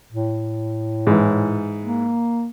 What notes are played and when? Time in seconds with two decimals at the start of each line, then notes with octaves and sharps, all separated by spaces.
0.12 A2
1.07 G#2 E3
1.83 A#3